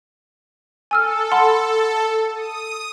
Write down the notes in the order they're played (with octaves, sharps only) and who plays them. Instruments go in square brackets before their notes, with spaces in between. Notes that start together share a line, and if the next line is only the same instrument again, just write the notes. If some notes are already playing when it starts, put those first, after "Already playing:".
[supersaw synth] A4 [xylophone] G#5 E6 F6
[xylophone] F#5 B5 C6
[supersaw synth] D#6